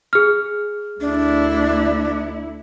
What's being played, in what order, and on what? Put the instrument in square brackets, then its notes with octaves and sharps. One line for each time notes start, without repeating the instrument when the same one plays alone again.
[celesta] G#4 F6
[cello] D2 E4 [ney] D4